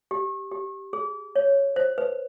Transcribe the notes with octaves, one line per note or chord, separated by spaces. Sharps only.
G4
G4
G#4
C#5
C5
B4